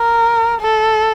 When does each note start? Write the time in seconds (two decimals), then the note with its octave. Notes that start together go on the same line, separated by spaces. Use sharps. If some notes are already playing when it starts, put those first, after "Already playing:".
Already playing: A#4
0.61 A4